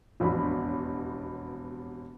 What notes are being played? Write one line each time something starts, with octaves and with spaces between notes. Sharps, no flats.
E1 A1 F2 B2 D4 B5